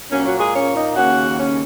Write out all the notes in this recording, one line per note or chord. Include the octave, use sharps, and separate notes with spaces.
A#2 F#3 A#3 C#4
F#3 F#4
G#3 G#4
C#4 C#5
D#4 D#5
D#2 C#3 A#3 C#4 F#4 F#5
C#4 C#5